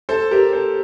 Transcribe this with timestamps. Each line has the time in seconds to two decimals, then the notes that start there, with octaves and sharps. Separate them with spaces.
0.09 A4 C5
0.31 G4 A#4
0.53 A4 C5